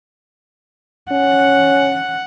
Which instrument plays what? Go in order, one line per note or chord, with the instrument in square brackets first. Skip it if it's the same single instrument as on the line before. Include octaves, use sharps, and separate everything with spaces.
[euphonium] C#4 [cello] F#5